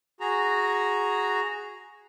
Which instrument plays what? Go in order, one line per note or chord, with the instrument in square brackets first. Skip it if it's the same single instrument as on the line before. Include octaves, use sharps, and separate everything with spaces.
[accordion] F#4 G#4 A#5